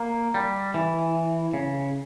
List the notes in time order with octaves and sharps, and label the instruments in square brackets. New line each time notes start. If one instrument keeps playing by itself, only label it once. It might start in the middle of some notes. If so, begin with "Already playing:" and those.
Already playing: [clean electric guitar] A#3
G3
E3
C#3